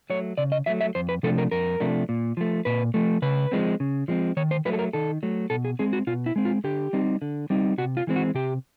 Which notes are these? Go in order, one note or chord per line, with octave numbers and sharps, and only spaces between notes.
F#3 A3 C#5
C#3 D5
D#5
F#3 A3 E5
E5
F2 C5
B4
C3 F3 A3 D4 A4
A#4
F2 A#4
C3 F3 A3 D4
A#2
F3 A3
A#2 B4
F3 A3
C#3 B4
F3 G#3 C4
C#3
F3 G#3 C4
D#3 C#5
C5
F#3 A3 B4
A4
A#4
D#3 A4
F#3 A3
B2 A4
G#4
G#3 C4 G#4
F#4
B2 F4
E4
G#3 C4
F4
D3 G4
G3 C4 D#4
D3
G3 C4 D#4
C3 F#4
F4
E3 G#3 C4
F#4
C3 G4